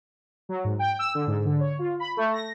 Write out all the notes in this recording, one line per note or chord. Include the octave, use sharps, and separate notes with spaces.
F#3
G#2
G5
E6
D3
G#2
D3
C#5
F4
B5
A3
A#6